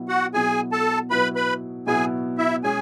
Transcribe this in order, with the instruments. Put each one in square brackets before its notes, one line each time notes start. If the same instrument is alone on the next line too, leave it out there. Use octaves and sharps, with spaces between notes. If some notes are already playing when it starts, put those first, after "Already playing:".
Already playing: [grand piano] B2 F#3 B3 E4
[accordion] F#4 F#5
[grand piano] B2 F#3 B3 E4 [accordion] G#4 G#5
[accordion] A4 A5
[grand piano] B2 F#3 B3 E4 [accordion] B4 B5
[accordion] B4 B5
[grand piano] B2 F#3 B3 E4 [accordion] G#4 G#5
[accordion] E4 E5
[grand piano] B2 G#3 C#4 [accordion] G#4 G#5